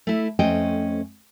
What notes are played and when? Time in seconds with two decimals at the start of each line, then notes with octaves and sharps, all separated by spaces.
0.07 A3 E4
0.39 F2 A3 C#4 C5 D#5 G5